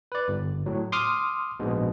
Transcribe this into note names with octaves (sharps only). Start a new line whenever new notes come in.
B4 D5
G1
A2 F#3
C6 D6 D#6 F6
A#1 G#2 B2